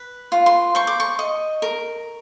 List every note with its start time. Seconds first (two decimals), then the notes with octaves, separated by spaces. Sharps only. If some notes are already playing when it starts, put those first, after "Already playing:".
Already playing: B4
0.32 F4
0.46 C6
0.75 C5 C#6
0.87 D6
1.00 C#6
1.19 D#5
1.62 A#4